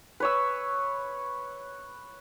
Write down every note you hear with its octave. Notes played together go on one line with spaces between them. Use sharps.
B4 C#5 E6